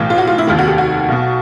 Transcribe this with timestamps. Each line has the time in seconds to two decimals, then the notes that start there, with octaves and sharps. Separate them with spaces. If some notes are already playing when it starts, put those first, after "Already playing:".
Already playing: B1 A2 E3
0.10 F4
0.18 F#4
0.27 F4
0.38 E4
0.47 F1 D#2 D#3 F4
0.59 F#4
0.68 G4
0.78 F#4
1.08 B1 B2